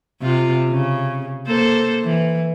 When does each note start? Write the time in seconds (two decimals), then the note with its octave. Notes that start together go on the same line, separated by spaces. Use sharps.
0.22 C3 F4
0.70 C#3
1.47 A#3 A4 C5
2.03 E3